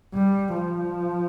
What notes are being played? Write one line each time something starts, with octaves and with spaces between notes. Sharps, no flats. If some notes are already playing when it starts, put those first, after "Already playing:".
G3
F3